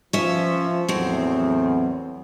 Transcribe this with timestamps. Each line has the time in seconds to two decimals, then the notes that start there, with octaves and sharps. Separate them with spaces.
0.13 F3 C#4 E5
0.89 E2 A2 F#3 C4